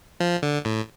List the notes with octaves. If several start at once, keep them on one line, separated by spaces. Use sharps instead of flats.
F3
D3
A2